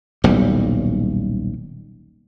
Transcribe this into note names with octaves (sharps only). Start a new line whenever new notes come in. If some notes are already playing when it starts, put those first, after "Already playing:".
D#1 B1 A2 G3